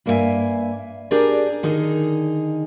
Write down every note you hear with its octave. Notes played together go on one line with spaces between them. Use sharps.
G2 A#3 E4 A4 E5 G#5
D4 G4 G#4 A#4 D5
D3 D#3 D#4 G#4 A#4